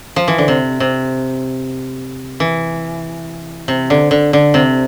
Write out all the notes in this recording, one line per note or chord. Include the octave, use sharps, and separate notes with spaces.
F3
E3
D3
C3
C3
E3
C3
D3
D3
D3
C3